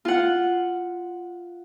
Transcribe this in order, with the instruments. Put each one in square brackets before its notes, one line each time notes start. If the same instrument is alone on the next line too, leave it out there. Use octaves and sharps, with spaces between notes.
[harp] F4 F#5